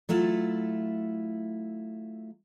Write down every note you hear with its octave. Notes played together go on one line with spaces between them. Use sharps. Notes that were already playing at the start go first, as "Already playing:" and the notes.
F#3 A3 E4 F4